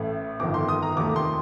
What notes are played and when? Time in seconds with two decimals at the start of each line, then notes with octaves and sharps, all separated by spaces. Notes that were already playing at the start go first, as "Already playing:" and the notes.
Already playing: A1 A2 A3
0.40 G1 F2 D#3 D6
0.54 C6
0.68 D#6
0.82 A#5
0.96 F1 D#2 D#3 A3 D6
1.16 C6